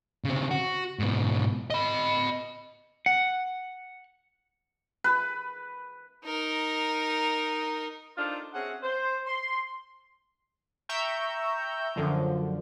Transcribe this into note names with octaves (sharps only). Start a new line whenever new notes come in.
C#3 C4
F#4
G#2 B2
D#5 B5
F#5
B4
D#4 A#4
D4 D#4 F4 A4 A#4 C5
C4 C#4 F#4 G#4 E5 F#5
C5
C6
E5 G5 A#5 C#6 E6 G6
F#2 D3 F3